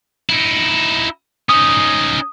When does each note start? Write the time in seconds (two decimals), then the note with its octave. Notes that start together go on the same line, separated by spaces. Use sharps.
0.30 D#4 E4
1.49 C#4 D#4 D#6